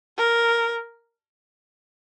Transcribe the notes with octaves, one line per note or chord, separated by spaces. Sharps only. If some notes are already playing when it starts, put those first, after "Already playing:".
A#4